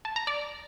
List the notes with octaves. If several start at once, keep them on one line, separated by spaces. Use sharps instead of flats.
A5
A#5
D5